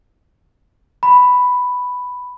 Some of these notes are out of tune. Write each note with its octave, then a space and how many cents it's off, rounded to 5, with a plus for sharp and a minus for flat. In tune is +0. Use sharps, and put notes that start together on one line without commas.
B5 +5